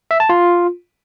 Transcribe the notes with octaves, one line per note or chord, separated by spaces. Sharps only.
E5
A5
F4